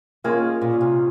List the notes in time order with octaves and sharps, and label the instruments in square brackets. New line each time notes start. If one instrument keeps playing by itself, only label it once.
[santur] G#3 C#4 F4 G#4 [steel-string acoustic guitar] A#3
[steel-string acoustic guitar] A#2
C3